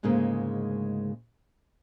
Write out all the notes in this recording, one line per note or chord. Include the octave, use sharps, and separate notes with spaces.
D2 G#2 C#3 G#3 A#3